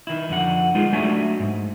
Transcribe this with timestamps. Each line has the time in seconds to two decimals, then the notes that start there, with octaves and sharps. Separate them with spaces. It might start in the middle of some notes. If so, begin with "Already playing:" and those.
0.07 D#3 E4
0.29 F2 D3 F#5
0.75 G#3 D#4 F4 G#4
0.93 F#3 A3 D4 E5 G#5
1.40 G#2